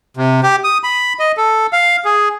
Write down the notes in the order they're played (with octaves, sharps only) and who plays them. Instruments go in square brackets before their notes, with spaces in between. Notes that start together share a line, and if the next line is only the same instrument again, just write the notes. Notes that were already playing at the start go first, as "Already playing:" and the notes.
[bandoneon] C3
G4
D#6
B5
D#5
A4
F5
G#4